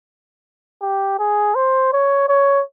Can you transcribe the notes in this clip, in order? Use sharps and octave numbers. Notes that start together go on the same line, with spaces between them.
G4
G#4
C5
C#5
C#5